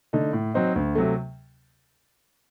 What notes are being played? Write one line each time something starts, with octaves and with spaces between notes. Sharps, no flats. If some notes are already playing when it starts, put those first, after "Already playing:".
D3 A3 D#4
A2
F#3 C4 D#4
D2
C3 F#3 A3